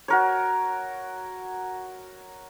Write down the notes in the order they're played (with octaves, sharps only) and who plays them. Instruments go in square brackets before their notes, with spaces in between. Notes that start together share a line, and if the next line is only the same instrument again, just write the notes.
[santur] F#4 A#4 C#5